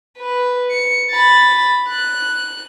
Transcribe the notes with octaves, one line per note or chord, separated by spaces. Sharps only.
B4
C#7
B5 A6
F#6